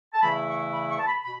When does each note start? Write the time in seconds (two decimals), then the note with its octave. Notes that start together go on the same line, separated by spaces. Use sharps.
0.13 A5
0.22 E2 C#3 E3 A3 E4 B5
0.47 C#6
0.72 B5
0.90 C#6
0.99 A5
1.07 B5
1.24 B2 B5